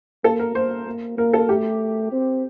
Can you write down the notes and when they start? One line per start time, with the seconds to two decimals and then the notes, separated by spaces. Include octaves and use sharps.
0.24 A#3 A4
0.39 A#4
0.55 A#3 C5
0.86 A#3
1.17 A#3 A#4
1.33 A4
1.49 A3 G4
2.12 C4